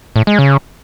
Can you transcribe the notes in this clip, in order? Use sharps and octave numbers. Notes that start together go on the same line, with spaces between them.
A2
G#3
C#3